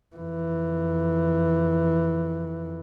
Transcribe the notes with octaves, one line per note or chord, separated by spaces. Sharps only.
F2 E3